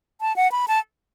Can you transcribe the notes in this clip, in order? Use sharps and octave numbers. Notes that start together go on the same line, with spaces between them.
A5
F#5
B5
A5